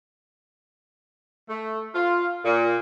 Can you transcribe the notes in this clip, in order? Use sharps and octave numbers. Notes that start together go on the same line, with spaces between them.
A3
F4
A#2